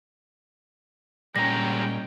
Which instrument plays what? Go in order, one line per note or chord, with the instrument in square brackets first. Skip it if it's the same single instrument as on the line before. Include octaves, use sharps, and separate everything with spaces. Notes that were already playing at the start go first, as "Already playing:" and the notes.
[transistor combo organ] A#2 [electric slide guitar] G3 G#3 A#5 [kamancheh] C#4 G5 [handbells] A#6